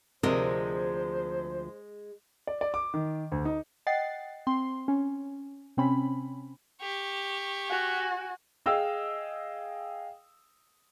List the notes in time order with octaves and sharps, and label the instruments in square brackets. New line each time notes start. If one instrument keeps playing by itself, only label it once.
[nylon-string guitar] D2 F3 A#4 [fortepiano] C3 [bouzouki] G#3 [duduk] C5
[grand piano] D5
D5
D6
D#3
D2
D#4
[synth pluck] D#5 F#5 G5 A6 C7
C4 C6
C#4
C3 C4 C#4 B5
[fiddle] G4 C#6
[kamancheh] F#4 G#5
[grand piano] G#4 D#5 F5 G5 E6